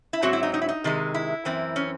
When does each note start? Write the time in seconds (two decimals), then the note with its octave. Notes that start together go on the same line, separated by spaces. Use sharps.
0.13 E4
0.22 G#2 F#3 C4 F#4
0.33 E4
0.43 D#4
0.54 D#4
0.62 E4
0.69 D#4
0.84 C3 D#3 G#3
1.14 E4
1.45 F#2 E3 C4
1.76 C#4